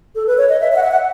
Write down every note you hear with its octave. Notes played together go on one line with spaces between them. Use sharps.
A4
B4
C#5
D#5
E5
E5
F#5
E5
F#5